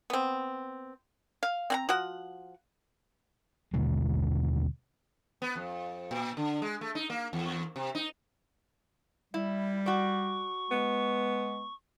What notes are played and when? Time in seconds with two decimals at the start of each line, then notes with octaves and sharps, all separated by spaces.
0.10 B3 C4
1.43 F5
1.70 C4 F#5 A#5
1.89 F3 F#4 F#5
3.74 D#2 B2 D3 G#3
5.42 B3
5.56 F2
6.11 A#2
6.37 D3
6.62 G#3
6.81 A3
6.95 D#4
7.10 A#3
7.33 E2
7.76 C3
7.95 D#4
9.34 G3 E4
9.86 F#4 D5 C#6
10.71 G#3 B3